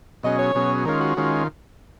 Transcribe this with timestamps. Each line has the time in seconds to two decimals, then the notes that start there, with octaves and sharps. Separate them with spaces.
0.23 B2 F#3 C#4 G#4 D#5
0.39 C#5
0.55 B2 F#3 C#4 G#4
0.85 D#3 G#3 C#4 F4 A#4
1.00 F#4
1.17 D#3 G#3 C#4 F4